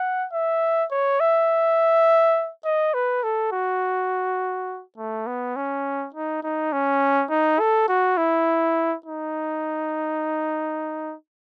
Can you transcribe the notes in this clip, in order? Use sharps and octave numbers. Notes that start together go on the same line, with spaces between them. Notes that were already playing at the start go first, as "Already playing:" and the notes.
Already playing: F#5
E5
C#5
E5
D#5
B4
A4
F#4
A3
B3
C#4
D#4
D#4
C#4
D#4
A4
F#4
E4
D#4